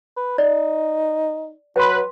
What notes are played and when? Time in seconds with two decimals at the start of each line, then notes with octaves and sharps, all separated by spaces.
0.17 B4
0.38 D#4 D5
1.76 F#3 B4 G5 C6